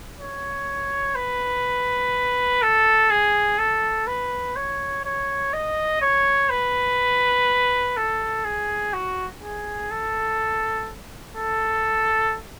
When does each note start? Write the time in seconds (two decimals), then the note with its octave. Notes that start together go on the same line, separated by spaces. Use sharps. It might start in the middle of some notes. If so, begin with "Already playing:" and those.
0.19 C#5
1.16 B4
2.62 A4
3.10 G#4
3.58 A4
4.07 B4
4.56 C#5
5.05 C#5
5.53 D#5
6.02 C#5
6.50 B4
7.97 A4
8.45 G#4
8.93 F#4
9.42 G#4
9.91 A4
11.36 A4